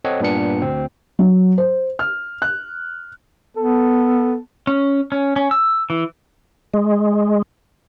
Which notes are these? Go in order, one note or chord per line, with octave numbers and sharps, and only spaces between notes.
C4 A4 C#5 D#5 F#5
G2 A#2 B3 D4 C#7
D2 C4
F#3
C5
F6
F#6
B3 A4
C#4
C#4
C#4
E6
E3
G#3